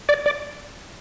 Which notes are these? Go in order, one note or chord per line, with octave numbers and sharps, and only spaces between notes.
D5
D5